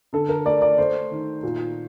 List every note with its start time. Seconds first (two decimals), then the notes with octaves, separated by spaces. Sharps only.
0.13 D3 A4
0.29 A#4
0.45 A3 D5
0.62 D5
0.78 A3 C5
1.11 D#3
1.43 A#2